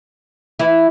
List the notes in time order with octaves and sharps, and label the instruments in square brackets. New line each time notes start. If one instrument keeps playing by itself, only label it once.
[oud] E3 E4